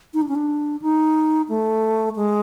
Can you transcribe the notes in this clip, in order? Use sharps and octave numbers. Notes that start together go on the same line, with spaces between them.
D#4
D4
C#4
D4
D#4
A3
G#3